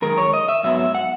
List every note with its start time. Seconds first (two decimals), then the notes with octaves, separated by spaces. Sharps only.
0.02 F#2 D#3 G#3 A#4
0.18 C#5
0.34 D#5
0.49 E5
0.63 G#2 F#3 B3 E5
0.79 E5
0.95 F#5